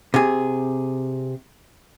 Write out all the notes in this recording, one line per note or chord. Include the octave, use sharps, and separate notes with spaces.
C3 G#4